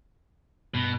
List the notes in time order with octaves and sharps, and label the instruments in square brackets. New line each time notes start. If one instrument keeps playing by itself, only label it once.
[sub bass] G2 [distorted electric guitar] B2